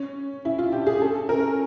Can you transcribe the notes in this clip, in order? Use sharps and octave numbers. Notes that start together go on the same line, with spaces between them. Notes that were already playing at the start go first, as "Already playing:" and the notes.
Already playing: C#4
C#4 E4
F4
D4 G4
G#4
C#4 A4
C#4 A#4